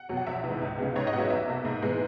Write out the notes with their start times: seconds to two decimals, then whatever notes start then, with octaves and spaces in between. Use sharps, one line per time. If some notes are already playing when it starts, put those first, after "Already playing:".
Already playing: F#5
0.09 E2 B2 F#3
0.17 F#5
0.27 A#1 E5
0.44 G#2 E3
0.61 C#2
0.78 C#3 G#3 B3
0.95 G#2 C#5
1.07 D#5
1.13 B3 F#5
1.17 F#3 E5
1.30 E2 E5
1.48 B2 A#3
1.65 G#2
1.82 E3 G#3 B3